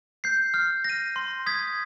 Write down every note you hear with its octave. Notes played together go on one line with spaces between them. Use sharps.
G6 C7
F6
A#6
D#7
C6
D#6 G#6 B6